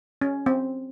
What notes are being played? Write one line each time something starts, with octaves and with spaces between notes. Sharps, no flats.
C#4
C4